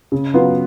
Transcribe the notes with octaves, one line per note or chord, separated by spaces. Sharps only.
C#3
F#3 B3 F4